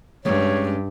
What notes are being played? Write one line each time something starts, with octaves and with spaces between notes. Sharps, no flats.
G2 G#3 C#4 C#5